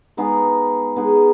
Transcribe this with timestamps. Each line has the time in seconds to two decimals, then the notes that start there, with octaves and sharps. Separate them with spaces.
0.17 G#3 B3 D#4 G#4
0.96 G#3 B3 D#4 G#4